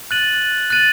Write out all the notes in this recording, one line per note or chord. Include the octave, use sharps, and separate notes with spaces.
F#6 A6 D#7 F#7
F#6 A6 D#7 F#7